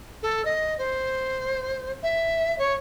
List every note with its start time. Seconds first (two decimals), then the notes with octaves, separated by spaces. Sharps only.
0.22 A4
0.45 D#5
0.78 C5
2.03 E5
2.58 C#5